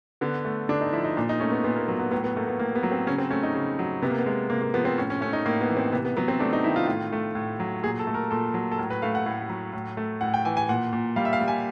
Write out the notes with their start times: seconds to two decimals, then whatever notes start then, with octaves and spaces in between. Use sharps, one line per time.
0.21 D3 B3
0.45 A3
0.69 D3 D4
0.81 D#4
0.93 F3 E4
1.04 D#4
1.17 A#2 D4
1.29 D#4
1.40 A3 C#4
1.52 B3
1.64 A#2 B3
1.76 A#3
1.88 F#3 B3
1.99 B3
2.11 A2 B3
2.24 B3
2.36 A3 A#3
2.48 B3
2.59 A2 A#3
2.75 B3
2.83 F#3
2.92 C4
3.07 C#3 C#4
3.18 C4
3.30 A3 C#4
3.43 D#4
3.55 C#3
3.79 F#3
4.02 C3 B3
4.10 A#3
4.19 B3
4.26 G#3
4.50 C3 A#3
4.61 A#3
4.74 F3 B3
4.85 C4
4.97 A2 C#4
5.10 C#4
5.21 A3 C#4
5.33 D#4
5.45 A2 A#3
5.61 B3
5.69 E3
5.77 C4
5.92 C3 B3
6.05 B3
6.17 F#3 B3
6.28 C4
6.40 A3 D4
6.53 D#4
6.64 D#3 E4
6.76 F4
6.87 A2 F4
7.12 A3
7.35 A2
7.60 F#3
7.83 A#2 G#4
7.99 A4
8.07 A3
8.14 A#4
8.30 A#2 A4
8.54 F#3
8.72 A4
8.78 A2 A#4
8.90 B4
9.02 A3 F5
9.15 F#5
9.26 A2
9.49 F#3
9.73 A2
9.97 A3
10.21 A2 F#5
10.34 G5
10.45 E3 G#5
10.57 G#5
10.69 A#2 F#5
10.93 A#2
11.16 G3 F5
11.25 E5
11.33 F5
11.41 G3
11.48 G#5